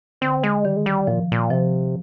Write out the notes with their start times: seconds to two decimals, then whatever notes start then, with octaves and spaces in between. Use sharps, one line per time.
0.21 D3 C4
0.43 G#3
0.65 D#3 G3
0.77 G#3
0.86 G3
1.07 A#2 F3
1.32 A#2
1.50 C3 F3